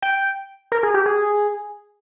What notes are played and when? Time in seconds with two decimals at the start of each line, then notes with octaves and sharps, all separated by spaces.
0.02 G5
0.72 A#4
0.83 G#4
0.94 G4
1.06 G#4